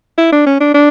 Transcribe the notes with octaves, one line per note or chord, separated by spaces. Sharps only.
E4
D4
C#4
D4
D4